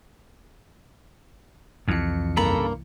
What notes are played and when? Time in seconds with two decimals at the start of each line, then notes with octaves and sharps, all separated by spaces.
1.88 C2 F2 E3 C#7
2.37 G2 C#3 A#3 A4 A#5 B5